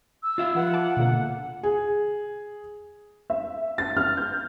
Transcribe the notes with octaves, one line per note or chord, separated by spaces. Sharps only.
E6
F4 E5 F5
F3 B4 F#5
A5 D6
B2 D3 A#3
G#4
E5
A6
F6
G6